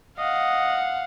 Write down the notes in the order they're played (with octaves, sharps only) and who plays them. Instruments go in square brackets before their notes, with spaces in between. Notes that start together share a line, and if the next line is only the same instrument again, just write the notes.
[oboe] D#5 [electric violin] F5 F#5